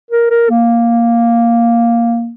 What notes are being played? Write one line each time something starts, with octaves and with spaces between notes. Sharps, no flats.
A#4
A#4
A#3